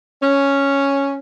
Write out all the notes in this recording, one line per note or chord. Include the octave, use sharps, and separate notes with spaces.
C#4